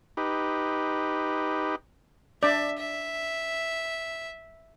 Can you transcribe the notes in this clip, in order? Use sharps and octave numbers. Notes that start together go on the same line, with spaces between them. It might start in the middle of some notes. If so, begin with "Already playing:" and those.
D#4 G4 B4
D4 D5 E5
E5